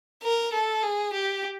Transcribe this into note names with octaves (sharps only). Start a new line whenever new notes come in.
A#4
A4
G#4
G4